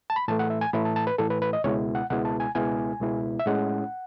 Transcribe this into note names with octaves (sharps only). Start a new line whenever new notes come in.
A5
B5
A2 E3 A3 A5
F#5
E5
G#5
A2 E3 A3 B5
A5
A5
B4
A2 E3 A3 A4
B4
B4
D#5
C#2 B2 G#3 B3 E4 C#5
F#5
C#2 B2 G#3 B3 E4 F#5
A5
G#5
C#2 B2 G#3 B3 E4 G#5
C#2 B2 G#3 B3 E4
E5
A2 G#3 C#4 E4 F#5